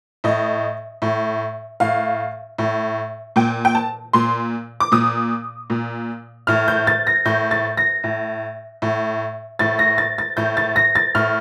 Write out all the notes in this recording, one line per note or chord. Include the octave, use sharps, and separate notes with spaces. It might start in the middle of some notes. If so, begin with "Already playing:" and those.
A2 D#5
A2
A2 F5
A2
A#2 G5
G5
A5
A#2 C6
D6
A#2 D#6
A#2
A2 F6
G6
A6
A#6
A2 G6
A6
A#6
A2
A2
A2 A6
A#6
A6
A6
A2 G6
A6
A#6
A6
A2 F6